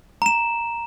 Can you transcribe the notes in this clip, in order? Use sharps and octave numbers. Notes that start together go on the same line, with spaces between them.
A#5 E7